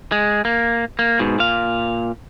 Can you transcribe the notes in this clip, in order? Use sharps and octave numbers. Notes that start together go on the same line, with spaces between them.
G#3
A#3
A#3
G#2 B2
A#2 F5